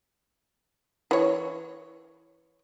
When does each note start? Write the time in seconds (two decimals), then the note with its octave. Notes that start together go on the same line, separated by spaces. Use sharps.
1.11 E3 C#5